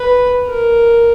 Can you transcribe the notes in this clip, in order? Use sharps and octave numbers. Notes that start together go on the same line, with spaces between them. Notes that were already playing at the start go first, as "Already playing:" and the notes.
Already playing: B4
A#4